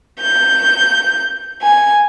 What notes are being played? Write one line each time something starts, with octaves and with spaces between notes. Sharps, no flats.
G6
G#5